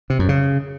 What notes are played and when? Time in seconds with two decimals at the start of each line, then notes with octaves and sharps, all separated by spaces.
0.10 C3
0.19 F#2
0.29 C#3